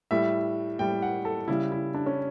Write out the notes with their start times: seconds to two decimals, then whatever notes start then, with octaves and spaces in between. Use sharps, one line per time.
0.11 A2 G3 E5
0.79 A2 G3 G5
1.02 F#5
1.25 A4
1.48 C#3 G3 E4
1.72 E4
1.94 D4
2.06 C#4